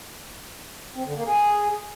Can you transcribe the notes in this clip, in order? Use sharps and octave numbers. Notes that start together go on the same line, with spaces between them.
C4
D3
A#3
G#4